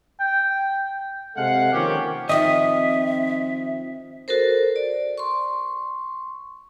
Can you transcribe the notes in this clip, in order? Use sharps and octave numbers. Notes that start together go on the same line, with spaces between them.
G5
C3 G#3 A4 F5 F#5
D#3 F3 A#3 C#4 G4
D#3 F3 C4 D#5 E5
F#4 A4 A#4 C5
D5
C6 C#6